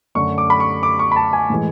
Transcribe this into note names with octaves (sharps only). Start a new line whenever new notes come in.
F#2 D3 A3 C#6
D6
B5
C#6
D6
C#6
B5
A5
G#5
A2 E3 G#3